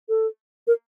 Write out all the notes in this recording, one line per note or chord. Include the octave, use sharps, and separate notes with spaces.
A4
A#4